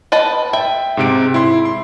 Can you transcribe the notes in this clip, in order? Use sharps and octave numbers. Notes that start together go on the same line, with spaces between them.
B4 D#5 A5
E5 G5
G#2 C3 D7
E4 C6
C6